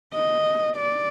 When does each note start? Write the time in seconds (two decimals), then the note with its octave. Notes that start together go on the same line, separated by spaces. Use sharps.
0.14 D#5
0.77 D5